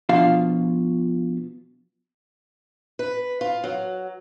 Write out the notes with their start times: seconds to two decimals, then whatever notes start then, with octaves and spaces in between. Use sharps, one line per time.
0.09 B2 F3 D4 F4 F5
2.99 B4
3.41 F4
3.64 F#3